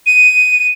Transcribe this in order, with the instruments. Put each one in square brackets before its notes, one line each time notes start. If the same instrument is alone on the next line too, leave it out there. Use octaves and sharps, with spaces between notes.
[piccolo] D#7